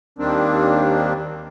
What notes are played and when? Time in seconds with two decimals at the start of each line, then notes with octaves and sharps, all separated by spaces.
0.19 D#2 D#3 G3 A#3 C4 D4